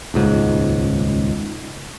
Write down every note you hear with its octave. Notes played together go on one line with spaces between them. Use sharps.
D#1 C#2 G#2